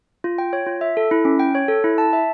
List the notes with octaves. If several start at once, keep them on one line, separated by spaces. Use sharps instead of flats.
F4
G5
C#5
F4
E5
A4
E4
C#4
G5
C#5
A4
E4
A5
E5